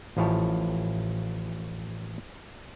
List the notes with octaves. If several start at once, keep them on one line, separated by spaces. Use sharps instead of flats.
A1 F3 E4 C#5 A5